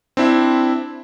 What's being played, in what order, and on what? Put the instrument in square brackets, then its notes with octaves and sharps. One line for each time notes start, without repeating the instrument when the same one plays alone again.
[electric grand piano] C4 D4 E4 E5